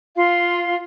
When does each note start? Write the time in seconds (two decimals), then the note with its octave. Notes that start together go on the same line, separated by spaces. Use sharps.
0.17 F4 F5 C6